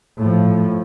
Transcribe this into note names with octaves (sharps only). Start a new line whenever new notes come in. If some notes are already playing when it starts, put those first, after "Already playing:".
A2 F3